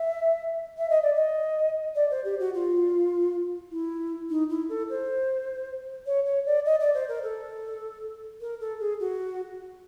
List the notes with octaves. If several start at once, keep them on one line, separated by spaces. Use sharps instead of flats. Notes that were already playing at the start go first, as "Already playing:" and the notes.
Already playing: E5
E5
D#5
D5
D#5
D5
C5
G4
F#4
F4
E4
D#4
E4
A4
C5
C#5
C#5
D5
D#5
D5
C5
A#4
A4
A#4
A4
G#4
F#4